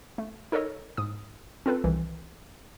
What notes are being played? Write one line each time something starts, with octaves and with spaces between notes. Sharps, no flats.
A3
D#4 A4 A#4 C#5 D#5
G#2 D#6
C4 F4 A4 B4
C2 D#3 E3